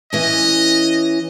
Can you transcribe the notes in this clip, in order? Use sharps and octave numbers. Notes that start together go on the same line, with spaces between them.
E3 C#4 D#5